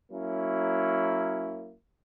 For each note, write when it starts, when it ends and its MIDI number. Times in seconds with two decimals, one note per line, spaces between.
0.12 1.74 54
0.12 1.74 58
0.12 1.74 61
0.12 1.74 64